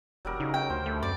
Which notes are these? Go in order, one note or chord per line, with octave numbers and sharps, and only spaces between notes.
E1 F#3 G3 A#4
C#3 D#4
G5
D2 C5
A3
F#2 D5